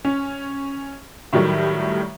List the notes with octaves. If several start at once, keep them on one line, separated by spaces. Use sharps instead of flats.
C#4
A2 D#3 F#3 G3 A3